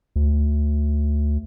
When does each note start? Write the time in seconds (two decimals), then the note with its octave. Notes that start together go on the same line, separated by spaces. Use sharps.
0.16 D2